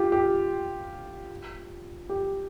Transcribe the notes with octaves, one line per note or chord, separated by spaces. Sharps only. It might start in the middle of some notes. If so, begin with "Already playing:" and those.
Already playing: F4 G4
G4
G4